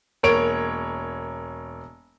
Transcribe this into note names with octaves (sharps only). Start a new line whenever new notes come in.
E1 A#3 C#5 D7 F7